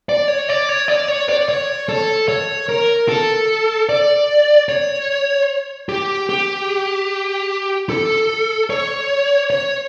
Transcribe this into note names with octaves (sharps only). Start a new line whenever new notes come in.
D5
C#5
D5
C#5
D5
C#5
D5
C#5
A4
C#5
A#4
A4
D5
C#5
G4
G4
A4
C#5
C#5